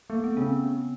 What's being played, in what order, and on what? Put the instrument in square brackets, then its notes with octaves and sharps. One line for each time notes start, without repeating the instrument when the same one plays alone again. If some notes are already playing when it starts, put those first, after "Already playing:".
[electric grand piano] A3 [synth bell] A#3
[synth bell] B3
[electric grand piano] C#3 [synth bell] C4